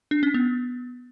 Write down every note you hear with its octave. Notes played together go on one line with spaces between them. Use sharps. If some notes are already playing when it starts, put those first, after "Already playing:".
D4
C#4
B3